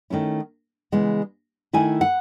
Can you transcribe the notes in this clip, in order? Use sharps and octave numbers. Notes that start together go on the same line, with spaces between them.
D#3 A3 C#4 E4
C#3 E3 G#3 B3
D#3 A3 E4 G#5
F#5